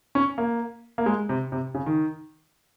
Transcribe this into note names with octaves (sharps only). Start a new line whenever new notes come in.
C#4
A#3
A#3
G#3
C3
C3
C#3
D#3